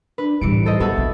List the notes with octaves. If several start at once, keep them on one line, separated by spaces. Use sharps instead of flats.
D4 B4
A2 E3 G3 D#4 C#7 D7
A4 C5 D#5
G3 B3 F#4 A4 E5
A#1